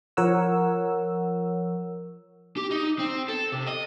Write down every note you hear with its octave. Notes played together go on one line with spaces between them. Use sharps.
F3 A#4 C#5 F#5 E6
G4
D#4
C4
A4
C3
D#5